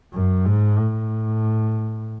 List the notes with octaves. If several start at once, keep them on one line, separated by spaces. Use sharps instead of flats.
F#2
G#2
A2